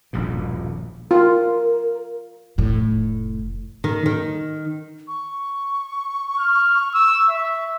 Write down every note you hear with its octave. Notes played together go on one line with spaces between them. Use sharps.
D#1 A#1 G2 B2
F4 A#4
F1 A2
D#3
D#3
C#6
F6
E6
E5